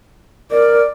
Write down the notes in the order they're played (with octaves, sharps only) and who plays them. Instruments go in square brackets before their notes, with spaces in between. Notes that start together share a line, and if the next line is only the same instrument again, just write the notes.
[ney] A#4 [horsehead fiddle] D5